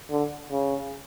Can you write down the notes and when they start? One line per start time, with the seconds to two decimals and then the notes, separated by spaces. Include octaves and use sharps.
0.10 D3
0.51 C#3